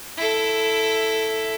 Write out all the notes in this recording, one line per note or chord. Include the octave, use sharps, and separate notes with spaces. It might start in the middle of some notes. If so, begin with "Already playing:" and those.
E4 A4